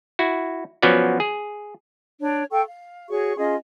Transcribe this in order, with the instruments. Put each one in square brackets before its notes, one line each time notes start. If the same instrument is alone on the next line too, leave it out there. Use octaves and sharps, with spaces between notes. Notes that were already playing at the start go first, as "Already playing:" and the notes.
[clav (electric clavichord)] E4 F#4
F3 F#3 B3 C#4 F#4 D5
G#4
[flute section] D4 C#5
A4 F5 G5 C#6
F5
F#4 G#4 C#5 C#6
C#4 F4 G#4 D#5